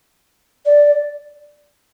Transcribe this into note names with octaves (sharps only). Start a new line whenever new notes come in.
D5